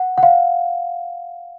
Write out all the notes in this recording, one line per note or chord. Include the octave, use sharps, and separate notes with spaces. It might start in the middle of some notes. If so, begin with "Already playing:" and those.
Already playing: F#5
F#5
F5